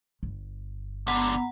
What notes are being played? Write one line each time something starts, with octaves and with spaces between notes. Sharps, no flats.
G1
D3 G#3 B3 F#5 A#5